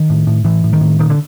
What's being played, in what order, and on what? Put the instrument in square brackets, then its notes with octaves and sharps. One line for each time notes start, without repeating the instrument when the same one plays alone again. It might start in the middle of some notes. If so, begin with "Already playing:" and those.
Already playing: [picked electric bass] D#3
A2
A2
A2 E3
A2
D#3
A2
A#2 D#3
D3